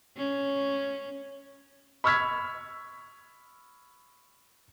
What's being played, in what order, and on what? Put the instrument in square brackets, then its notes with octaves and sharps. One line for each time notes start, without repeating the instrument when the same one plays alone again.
[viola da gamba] C#4
[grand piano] B5 C#6 E6 F6 G#6 B6